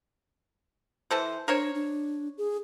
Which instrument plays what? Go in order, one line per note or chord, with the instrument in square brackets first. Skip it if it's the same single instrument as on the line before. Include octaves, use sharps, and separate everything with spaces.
[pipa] E3 A4 C5
[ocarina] D4 [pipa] A#4 C5 C#5
[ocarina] D4
G#4